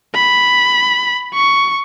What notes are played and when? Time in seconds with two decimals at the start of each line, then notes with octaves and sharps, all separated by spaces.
0.15 B5
1.34 C#6